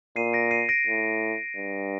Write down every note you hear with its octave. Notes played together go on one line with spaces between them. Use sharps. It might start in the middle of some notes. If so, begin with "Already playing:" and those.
A#2 C7 D#7
A#6 D7
C7 D#7
A#6 D7
A2
G2